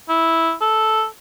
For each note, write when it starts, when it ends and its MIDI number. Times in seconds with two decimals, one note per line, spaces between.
0.09 0.53 64
0.61 1.05 69